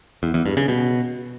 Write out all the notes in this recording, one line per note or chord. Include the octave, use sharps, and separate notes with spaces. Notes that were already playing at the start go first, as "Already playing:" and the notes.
E2
E2
G2
C#3
B2